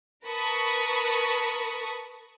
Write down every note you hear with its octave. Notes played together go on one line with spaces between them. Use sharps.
A#4 B4 A5 B5 C#6 D#6